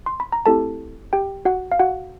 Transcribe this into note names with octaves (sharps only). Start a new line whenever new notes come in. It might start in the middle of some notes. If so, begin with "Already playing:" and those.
C6
B5
A#5
A3 C4 E4 G4 A4 A5
G4 G5
F#4 F#5
F5
F#4 F#5